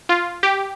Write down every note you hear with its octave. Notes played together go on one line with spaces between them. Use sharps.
F4
G4